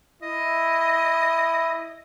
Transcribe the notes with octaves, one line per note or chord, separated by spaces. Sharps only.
E4 D#5